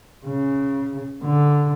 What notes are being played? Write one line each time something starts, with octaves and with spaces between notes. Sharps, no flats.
C#3
D3